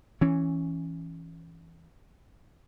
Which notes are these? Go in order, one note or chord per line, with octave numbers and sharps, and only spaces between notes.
E3 C#4